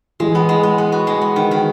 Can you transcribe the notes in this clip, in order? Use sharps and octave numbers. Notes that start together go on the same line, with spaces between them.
E3 G#3
B3
G#3
G#3
B3
F#4
G#3
B3
D#3
D#3